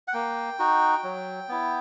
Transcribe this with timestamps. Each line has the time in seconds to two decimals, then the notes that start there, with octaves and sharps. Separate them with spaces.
0.08 F#5
0.13 A#3 G5
0.59 D#4 F#4
1.04 F#3
1.49 B3 E4